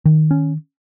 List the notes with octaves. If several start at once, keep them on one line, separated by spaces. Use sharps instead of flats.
D#3
C#4